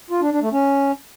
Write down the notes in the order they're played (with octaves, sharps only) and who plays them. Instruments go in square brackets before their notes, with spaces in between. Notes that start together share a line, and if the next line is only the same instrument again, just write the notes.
[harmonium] F4
D4
D4
A3
C#4